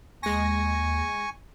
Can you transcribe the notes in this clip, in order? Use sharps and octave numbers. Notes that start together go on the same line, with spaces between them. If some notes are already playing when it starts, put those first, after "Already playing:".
D#2 G#3 G#5 C#6 A#6